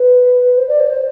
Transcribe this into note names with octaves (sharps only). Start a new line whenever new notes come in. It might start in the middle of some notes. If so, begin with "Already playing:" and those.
Already playing: B4
C5
D5
C5
D5
C5